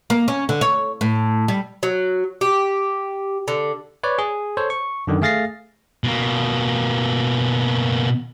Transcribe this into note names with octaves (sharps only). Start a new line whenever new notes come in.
A#3
C#4
D3
C#5
A2
G3
F#3
G4
D3
B4 C#5 D5
G#4
A4 C5 C#5
C#6
F#2 D3 D#3
A3 G#4 F5 A6 A#6 C7
B2 A#3